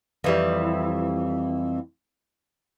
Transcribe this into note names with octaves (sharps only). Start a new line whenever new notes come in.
F2 E3 G3